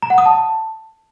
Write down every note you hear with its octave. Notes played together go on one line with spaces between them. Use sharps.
A#5
F#5
D#6
A5